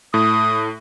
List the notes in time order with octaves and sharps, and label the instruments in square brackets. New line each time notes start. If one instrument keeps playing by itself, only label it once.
[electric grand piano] A2 [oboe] D#6